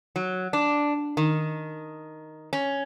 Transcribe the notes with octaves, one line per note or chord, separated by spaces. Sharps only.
F#3
D4
D#3
C#4